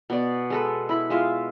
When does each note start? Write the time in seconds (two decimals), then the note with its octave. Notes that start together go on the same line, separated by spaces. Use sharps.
0.10 B2 D5
0.50 G#3 A4 B4
0.89 E4 B5
1.10 G#3 F4 E5